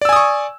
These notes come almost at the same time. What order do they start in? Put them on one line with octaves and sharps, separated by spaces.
D5 E6 G#5 D#6 C#6